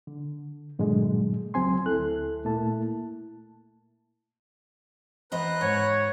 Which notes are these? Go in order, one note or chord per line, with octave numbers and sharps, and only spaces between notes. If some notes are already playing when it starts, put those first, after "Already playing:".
D3
G2 A#2 D3 F#3 G#3
C#2 F#3 C4 G#5 C6
D2 E4 A4 F#6
A#2 A3 A#3 E4 A5
E2 B4 C5 D#5 A#5 F#6
G#2 C#5